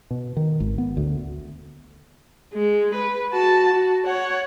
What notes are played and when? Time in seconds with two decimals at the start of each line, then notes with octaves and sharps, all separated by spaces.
0.11 B2
0.37 D#3
0.60 G#1
0.78 B3
0.97 D2
2.54 G#3
2.94 B4
3.32 F#4 A5
3.73 F#4
4.06 C#5 F#5